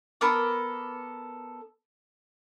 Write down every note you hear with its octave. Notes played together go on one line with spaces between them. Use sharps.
B3 A4 A#4 D6